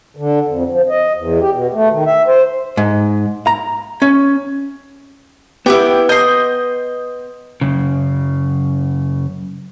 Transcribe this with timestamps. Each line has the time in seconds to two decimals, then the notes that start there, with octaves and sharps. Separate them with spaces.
0.17 D3
0.48 F2
0.70 F3
0.89 D#5
1.16 E2
1.40 G4
1.53 B2
1.73 A3
1.91 D#3
2.06 E5
2.27 C5
2.77 G#2
3.47 A#5
4.02 C#4
5.66 B3 E4 G4 F#5 D6
6.09 D#5 C6 G6
7.61 F#2 C#3